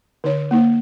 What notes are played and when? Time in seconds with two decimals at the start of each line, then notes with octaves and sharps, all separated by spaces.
0.24 D3 D#4 C#5
0.51 A#3 D#4 C5